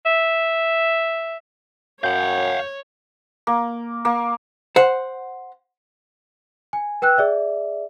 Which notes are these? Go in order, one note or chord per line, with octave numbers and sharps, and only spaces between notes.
E5
F#2 C#5 F5 F#5 G6
A#3
A#3
C5 F#5
G#5
B4 G5 E6 F#6
G#4 D5 E5